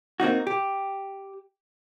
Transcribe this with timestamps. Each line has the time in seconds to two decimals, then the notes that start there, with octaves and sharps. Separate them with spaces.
0.20 A#3 C4 D#4 F#4
0.47 G4